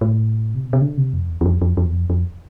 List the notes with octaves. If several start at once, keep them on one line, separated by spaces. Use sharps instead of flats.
A2
C3
B2
C3
D3
C3
F2
E2
E2
F2
F2
F2
E2
F2
F2